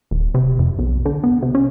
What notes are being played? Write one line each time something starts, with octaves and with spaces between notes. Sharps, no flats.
D#1
C3
F2
B1
D3
B3
C3
C#4